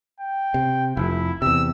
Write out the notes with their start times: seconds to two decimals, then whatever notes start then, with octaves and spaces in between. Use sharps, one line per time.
0.21 G5
0.54 C3
0.97 F1 E4
1.42 E2 C3 E6